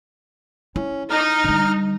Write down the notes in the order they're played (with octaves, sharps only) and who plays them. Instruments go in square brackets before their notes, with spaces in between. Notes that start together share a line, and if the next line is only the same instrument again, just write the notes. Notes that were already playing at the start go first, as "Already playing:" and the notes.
[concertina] C#4 [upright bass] E4
[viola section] D#4 [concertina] A#5 F6
[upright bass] D3 G3